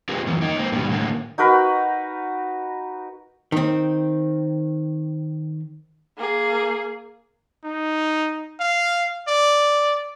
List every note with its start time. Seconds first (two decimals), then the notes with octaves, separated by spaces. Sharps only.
0.09 C4 F4 G4 G#4 A#4 B4
0.27 F#2 E3 F3
0.41 A#3 D#4
0.57 A#3 C4
0.72 G#2 B2 D#3 G3
0.89 A2 D3 A#3
1.38 D#4 F#4 A#4 B4
3.52 D#3 C4
6.18 A#3 G#4
7.64 D#4
8.60 F5
9.28 D5